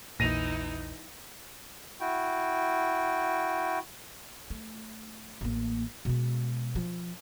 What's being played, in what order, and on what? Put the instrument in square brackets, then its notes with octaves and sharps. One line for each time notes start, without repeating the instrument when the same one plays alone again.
[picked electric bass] A#1 E2 A#2 [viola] E3 D#4 [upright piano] A#6 D#7 F7
[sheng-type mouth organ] E4 F#4 G5
[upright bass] A3
A1 A#3
B2 G#3
F3